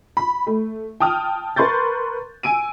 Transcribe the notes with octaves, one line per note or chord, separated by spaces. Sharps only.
B5
A3
G5 A5 D#6 F6
A#4 B4 C6 C#6 G6 A6
G#5 E6 D7 D#7